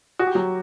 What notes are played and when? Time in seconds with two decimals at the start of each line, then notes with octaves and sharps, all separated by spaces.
0.19 F#4
0.27 G4
0.35 F#3 F#4